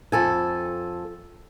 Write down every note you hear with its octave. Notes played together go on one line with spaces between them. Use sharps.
F2 A4 G#5